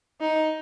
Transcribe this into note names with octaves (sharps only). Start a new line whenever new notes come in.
D#4